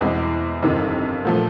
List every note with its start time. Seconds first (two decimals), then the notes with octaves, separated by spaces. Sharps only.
0.01 E2 B2 G#3 C4 E4
0.62 G1 F2 C3 D#3
1.25 A#2 F3 A3